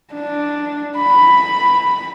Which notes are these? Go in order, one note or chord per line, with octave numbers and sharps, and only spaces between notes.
D4
B5